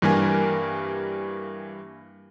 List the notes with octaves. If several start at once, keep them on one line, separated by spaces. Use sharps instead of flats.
G2 E3 G3 A#3 A#4 G#5